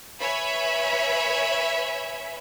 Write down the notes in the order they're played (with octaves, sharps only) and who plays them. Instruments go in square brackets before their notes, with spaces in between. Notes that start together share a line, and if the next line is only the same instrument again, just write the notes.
[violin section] B4 C#5 E5 G#5 B5